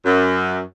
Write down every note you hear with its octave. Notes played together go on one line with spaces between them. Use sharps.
F#2